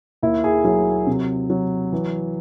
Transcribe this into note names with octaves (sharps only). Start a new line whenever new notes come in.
D#2 E4
G#4
F#3 G#4
C3
F#3
E3